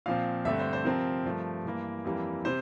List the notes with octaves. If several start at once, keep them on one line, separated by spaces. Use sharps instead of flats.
A#2 F3 C4 F5
G2 D3 A3 C4 E5
C5
C5
C3 F3 C4 A#4
G2 F3 A3
G2 E3 A#3
F2 E3 G3 A#3
C3 C5